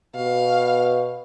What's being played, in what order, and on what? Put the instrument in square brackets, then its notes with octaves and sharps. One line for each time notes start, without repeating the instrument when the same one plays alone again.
[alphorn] B2 [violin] F5